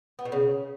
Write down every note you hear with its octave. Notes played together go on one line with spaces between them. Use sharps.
B3
B2
C#3